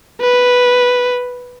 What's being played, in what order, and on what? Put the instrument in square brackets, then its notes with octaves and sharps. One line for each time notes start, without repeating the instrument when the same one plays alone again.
[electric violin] B4